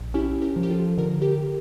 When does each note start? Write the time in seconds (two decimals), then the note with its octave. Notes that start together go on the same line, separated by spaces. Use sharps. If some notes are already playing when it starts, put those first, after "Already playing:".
Already playing: A#1
0.14 C#4 E4 G4
0.42 G4 A#4
0.56 F3
0.63 G4
0.70 F4 A4
0.98 D3 A#4
1.21 G4 A#4